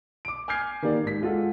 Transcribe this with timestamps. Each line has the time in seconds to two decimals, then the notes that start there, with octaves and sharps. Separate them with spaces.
0.25 D6 D7
0.48 G#5 D6 F6 G6 G#6 C7
0.82 D#3 A#3 G4 D5
1.03 G#2 B6
1.22 G#3 F4 A4 F#5